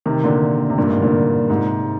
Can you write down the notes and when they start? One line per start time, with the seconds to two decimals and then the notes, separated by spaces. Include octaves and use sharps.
0.06 C3 D#3
0.24 A#2 D3
0.70 C3
0.78 G2 A#2
0.90 G#2 C3
1.01 A#2 D3
1.49 G#2 C3